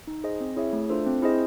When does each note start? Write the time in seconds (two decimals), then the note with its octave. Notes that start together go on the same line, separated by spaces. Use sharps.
0.07 D#4
0.24 G#4 C5 D#5
0.40 C4
0.56 E4 G#4 C#5 E5
0.73 A3
0.90 D4 F4 A4 C5
1.07 C4
1.22 E4 G#4 C5 D#5